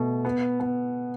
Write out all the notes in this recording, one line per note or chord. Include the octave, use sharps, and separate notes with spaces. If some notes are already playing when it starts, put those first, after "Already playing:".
Already playing: B2 A3
B3
B3